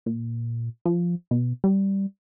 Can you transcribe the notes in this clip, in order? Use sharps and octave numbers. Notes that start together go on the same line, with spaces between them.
A#2
F3
B2
G3